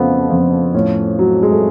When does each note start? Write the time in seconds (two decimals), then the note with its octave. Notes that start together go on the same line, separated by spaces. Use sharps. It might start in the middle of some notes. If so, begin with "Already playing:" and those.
Already playing: F2 C#3 F3 A3 B3
0.30 F2
0.74 A2 C#4
1.19 F#3
1.43 G#3
1.52 A3